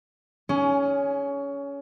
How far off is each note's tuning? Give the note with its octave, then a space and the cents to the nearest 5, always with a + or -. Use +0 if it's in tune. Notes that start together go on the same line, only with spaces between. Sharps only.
C#4 +20 G#4 +0